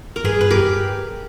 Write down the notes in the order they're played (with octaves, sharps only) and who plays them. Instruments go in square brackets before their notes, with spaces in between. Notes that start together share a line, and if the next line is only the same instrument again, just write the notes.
[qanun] A#4
[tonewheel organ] G2 [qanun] G#4 B4
[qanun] B4
G4 A#4